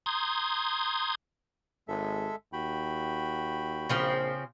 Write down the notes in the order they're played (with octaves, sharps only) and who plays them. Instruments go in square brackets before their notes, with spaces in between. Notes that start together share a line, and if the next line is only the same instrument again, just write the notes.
[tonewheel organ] A#5 C6 D#6 G6 G#6
[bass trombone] G#1 [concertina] G#3 A4 E5
[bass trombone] D#2 [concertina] F#4 G5 B5
[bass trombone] A#1 [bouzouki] C#3 F3 C4